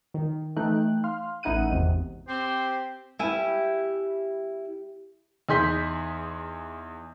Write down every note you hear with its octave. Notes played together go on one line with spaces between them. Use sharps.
D#3
E3 A3 D#4 G5 F#6
F5 C6 F6
A1 D#4 E4 F#5 F#6 D#7
G#1 E2 C3
C4 G4 C5
G3 E4 G4 B4 G#5
E2 D#4 G#4 C6 G6 B6